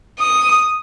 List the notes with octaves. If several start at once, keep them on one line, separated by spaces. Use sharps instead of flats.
D#6